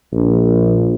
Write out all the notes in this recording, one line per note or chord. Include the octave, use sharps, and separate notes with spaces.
A#1